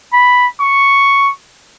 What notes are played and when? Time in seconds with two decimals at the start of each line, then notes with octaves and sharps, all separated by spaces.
0.13 B5
0.61 C#6